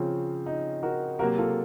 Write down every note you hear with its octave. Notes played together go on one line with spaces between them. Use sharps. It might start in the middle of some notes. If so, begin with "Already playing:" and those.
Already playing: C#3 F3 C4 C#4
D#4
F#4 A#4
C3 F#3 A#3 F#4 A#4
F4 A4